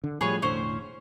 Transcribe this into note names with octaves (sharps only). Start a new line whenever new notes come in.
D3
A2 F3 G3 G#4 B4 C#5
E1 A2 D3 C#4 C5